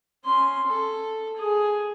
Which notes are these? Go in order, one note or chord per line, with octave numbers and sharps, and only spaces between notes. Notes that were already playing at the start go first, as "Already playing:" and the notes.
C#4 C6
A4
G#4